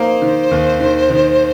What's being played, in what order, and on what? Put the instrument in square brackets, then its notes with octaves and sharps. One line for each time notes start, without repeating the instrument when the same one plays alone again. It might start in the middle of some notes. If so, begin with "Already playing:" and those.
Already playing: [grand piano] A#3 D#4 [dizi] C5
[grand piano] D#3
D#2
D#3
D#3